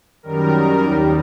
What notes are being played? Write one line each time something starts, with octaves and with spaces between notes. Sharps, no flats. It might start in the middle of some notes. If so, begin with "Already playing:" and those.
F#2 D#3 G3 A#4
D#2 D#3 G3 G4